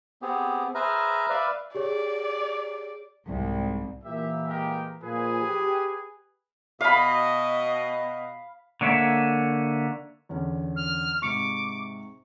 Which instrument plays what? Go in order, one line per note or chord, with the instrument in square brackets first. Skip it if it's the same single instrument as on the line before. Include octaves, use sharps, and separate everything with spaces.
[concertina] B3 C4 G4 G#4
G#4 B4 C5 E5 A#5 F6
B4 D5 E5 F5
[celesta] G4 G#4 C#5 [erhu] D5
[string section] C2 G#2
[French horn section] A#2 E3 A#3 [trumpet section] G4 E5
[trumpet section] G#3 G4 A#4
[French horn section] A#2 F3 [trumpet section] G#4 B4 G#5
[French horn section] G4
[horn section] B2 D#5 [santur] F5 B5
[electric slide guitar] D3 A#3 C#5 E5
[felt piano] E2 D3 C#4
[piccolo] F6
[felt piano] G#2 C3 [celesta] C#6 C#7 [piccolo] D6